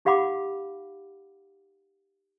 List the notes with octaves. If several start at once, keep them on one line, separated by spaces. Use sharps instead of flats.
D#4 G4 F5 F#5 B5 D6